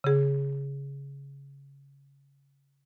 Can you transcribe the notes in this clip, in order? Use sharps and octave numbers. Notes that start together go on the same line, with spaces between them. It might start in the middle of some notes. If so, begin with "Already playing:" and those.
C#3 G#4